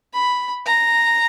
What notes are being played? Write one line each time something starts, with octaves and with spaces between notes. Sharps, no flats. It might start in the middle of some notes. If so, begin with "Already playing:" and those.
B5
A#5